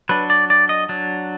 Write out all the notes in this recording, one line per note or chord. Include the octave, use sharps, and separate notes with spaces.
F#3 D4 B4
D5
D5
D#5
F#3 D4